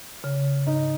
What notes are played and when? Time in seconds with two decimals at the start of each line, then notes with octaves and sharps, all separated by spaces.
0.24 C#3
0.66 G#2 D#4